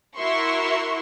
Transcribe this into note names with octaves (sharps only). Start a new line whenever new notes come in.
E4 F#4 A#4 E5 C6 C#6